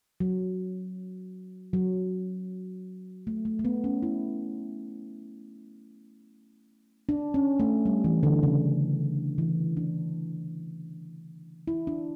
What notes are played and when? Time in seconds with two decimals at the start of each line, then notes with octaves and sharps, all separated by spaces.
0.20 F#3
1.73 F#3
3.27 A3
3.45 A3
3.59 A3
3.65 B3
3.84 C#4
4.02 E4
7.09 D4
7.34 C#4
7.60 A3
7.86 G3
8.04 E3
8.23 D3
8.43 C#3
9.38 E3
9.77 D4
11.67 E4
11.87 D4